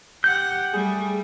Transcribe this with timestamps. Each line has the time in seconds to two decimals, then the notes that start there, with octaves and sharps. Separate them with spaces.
0.24 G4 F#5 G6
0.73 G3 A3 G#4